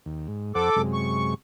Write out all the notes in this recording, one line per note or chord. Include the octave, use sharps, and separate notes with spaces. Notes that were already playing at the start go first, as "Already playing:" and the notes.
D#2
G#2
F2 A4 C5 F#5 D6
F#2 C3 G#3
C#6